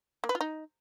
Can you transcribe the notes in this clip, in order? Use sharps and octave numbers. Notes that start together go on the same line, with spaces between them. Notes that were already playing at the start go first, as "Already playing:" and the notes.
A#3
B4
F4
D#4